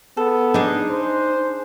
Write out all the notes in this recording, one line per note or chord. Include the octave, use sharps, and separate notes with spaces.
B3 A4
D4 D#4 G#4
C5